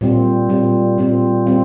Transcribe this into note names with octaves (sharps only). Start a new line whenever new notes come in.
A#2 G3 C4
A#2 G3 C4
A#2 G3 C4
G3 C4